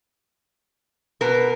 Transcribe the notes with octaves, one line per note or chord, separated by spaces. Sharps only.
B2 A#4 B4